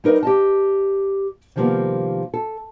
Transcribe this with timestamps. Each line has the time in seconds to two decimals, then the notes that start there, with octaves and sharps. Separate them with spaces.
0.04 G3 D#4 A#4 B4 D#5
0.23 G4 D#5 A5
1.56 C3 D#3 F3 G3 A#3 B3
2.34 A4